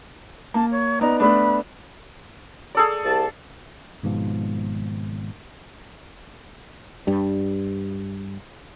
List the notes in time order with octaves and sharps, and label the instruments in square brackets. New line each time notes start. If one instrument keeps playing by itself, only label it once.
[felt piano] A#3 [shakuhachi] A5
[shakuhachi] C#5
[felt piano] B3 D#4 D5 [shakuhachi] A#5
[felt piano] A3 B3 D4 [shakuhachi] B5
[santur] G#4 A4 D5
[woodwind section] C2 A5
[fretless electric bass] G#1 G#2 B2 F3
G2 G3